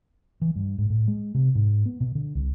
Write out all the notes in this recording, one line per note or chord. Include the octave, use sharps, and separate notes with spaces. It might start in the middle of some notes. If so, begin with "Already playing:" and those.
E3
G2
G#2
A2
G#3
C3
G#2
B3
B2
D3
C2